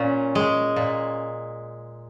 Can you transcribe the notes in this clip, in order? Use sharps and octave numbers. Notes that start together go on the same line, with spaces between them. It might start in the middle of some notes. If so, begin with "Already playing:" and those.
Already playing: A#2 C#4 C#5
G#3
A#2